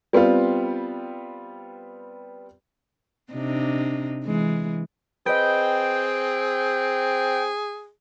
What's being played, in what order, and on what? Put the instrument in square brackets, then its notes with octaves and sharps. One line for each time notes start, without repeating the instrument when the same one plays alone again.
[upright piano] G3 B3 C4 F4
[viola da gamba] C3 D4 D#4
E3 G#3
[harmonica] C4 [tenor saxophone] G#4 [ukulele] B4 D#5 [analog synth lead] G5